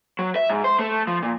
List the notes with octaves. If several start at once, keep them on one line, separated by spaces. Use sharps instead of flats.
F#3
E5
G#2
C5
A3
F3
A#2